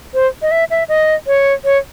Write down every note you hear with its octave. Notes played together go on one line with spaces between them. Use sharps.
C5
D#5
E5
E5
D#5
C#5
C#5